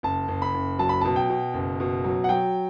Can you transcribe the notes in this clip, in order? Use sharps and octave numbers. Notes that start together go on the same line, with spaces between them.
F#1 A5
F#1
B5
F#1
F#3 A5
B5
B2 A5
G5
B2
F#1
B2
F#3
F#5
F#3 G5